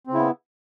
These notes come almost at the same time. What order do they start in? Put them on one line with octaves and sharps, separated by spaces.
C4 C#3 E4 B3